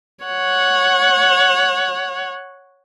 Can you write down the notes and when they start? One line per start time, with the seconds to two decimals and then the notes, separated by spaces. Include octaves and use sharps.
0.25 C#5 F#5